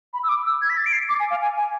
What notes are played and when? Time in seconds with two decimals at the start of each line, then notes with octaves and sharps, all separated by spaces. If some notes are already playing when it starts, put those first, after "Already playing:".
0.14 B5
0.23 E6
0.29 D6
0.46 E6
0.62 G#6
0.70 B6
0.78 A6
0.86 D7
0.93 C7
1.09 D6
1.20 G#5
1.31 F5
1.41 G#5
1.57 G#5